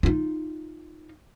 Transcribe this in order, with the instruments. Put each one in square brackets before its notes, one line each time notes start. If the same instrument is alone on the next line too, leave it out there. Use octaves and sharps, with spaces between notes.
[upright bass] D#4 F4